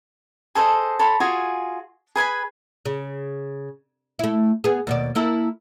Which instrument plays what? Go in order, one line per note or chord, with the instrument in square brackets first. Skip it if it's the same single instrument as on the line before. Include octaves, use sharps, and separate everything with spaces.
[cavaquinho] G#4 A4 C5 D#5
A4 C#5 B5 C6
F4 F#4 G#4 G#5
G#4 B4 G#5 B5
[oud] C#3
A3 E4
B3 G#4
D#2 B2 D5
A#3 E4 A4